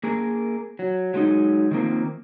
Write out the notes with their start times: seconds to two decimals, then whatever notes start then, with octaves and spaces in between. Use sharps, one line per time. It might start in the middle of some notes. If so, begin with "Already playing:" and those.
0.04 A#3 G#4 A#4
0.79 F#3
1.14 F#3 G#3 D#4
1.71 D#3 F3 A#3 C4